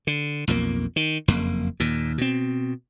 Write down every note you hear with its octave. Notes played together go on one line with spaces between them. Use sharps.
D3
B1 F2 D#3 A#3
D#3
F#1 F2 A#3
D#2 A#2
B2 C4